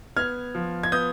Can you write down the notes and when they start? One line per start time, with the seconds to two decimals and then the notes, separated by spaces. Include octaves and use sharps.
0.17 B3 F6 G#6
0.55 F3
0.83 G#6
0.92 B3 D#6 G6